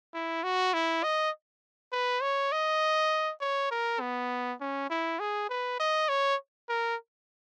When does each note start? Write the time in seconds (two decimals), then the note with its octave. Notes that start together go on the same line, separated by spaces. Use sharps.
0.14 E4
0.43 F#4
0.74 E4
1.03 D#5
1.92 B4
2.22 C#5
2.52 D#5
3.41 C#5
3.71 A#4
4.00 B3
4.61 C#4
4.90 E4
5.20 G#4
5.49 B4
5.80 D#5
6.09 C#5
6.69 A#4